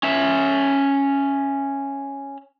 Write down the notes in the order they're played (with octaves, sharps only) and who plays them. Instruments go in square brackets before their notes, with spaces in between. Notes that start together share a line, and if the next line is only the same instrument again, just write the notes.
[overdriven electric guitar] C#4 E5